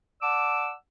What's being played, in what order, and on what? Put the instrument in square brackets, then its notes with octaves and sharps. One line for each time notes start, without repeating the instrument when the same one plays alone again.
[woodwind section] D5 F#5 A5 D6 E6